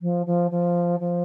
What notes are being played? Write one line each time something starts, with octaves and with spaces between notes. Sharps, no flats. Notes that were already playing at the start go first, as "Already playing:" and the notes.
F3
F3
F3
F3